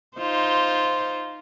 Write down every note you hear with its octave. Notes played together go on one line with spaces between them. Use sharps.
D#4 F4 C5